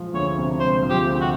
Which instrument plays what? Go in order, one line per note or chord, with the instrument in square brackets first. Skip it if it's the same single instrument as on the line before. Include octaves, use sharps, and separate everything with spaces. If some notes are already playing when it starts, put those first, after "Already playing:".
Already playing: [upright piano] F3 G#3
[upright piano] D2 [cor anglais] C#5
[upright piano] C3
[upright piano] G#3 [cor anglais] C5
[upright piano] F3
[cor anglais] G4
[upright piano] D2
[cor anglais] F#4